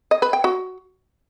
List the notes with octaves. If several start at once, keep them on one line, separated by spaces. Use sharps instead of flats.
D#5
B4
G5
F#4